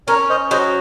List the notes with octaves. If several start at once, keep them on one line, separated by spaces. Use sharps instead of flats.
C#4 A#4 C#5
C5 D#5
F#3 C5 D#5